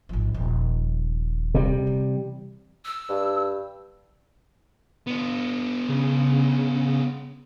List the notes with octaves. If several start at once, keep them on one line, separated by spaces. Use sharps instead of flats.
G#1 F3
D#1 F3
C3 G3
E3
E6
G2
B3 D4
C#3